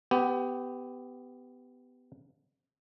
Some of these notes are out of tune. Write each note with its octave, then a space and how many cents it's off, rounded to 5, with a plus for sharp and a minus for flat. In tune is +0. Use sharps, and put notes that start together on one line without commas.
B3 +20 G4 +0